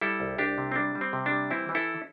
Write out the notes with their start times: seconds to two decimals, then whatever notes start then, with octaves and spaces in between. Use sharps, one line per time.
0.01 G3 E4 A4
0.20 C2
0.38 C2 D4 G4
0.58 C3
0.72 C4
0.76 G3 D4
0.95 G3
1.01 C4
1.13 C3
1.26 D4
1.31 G3
1.50 E3 C4 E4
1.69 E3
1.75 E4 A4